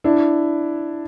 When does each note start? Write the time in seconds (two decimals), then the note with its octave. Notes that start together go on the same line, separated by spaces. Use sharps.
0.04 D4 E4